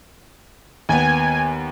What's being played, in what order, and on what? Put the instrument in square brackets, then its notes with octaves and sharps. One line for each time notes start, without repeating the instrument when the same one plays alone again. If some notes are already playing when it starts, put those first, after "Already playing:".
[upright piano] D#2 B3 [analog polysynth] G#5